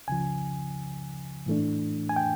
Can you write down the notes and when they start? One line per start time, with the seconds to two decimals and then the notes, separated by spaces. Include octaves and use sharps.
0.08 C#2 C#3 F3 G#5
1.46 A2 E3 A3 D4
2.09 G#5
2.16 G5